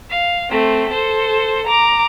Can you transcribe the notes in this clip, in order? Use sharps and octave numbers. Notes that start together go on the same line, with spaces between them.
F5
A3 C4
A4 C5
A#5 D6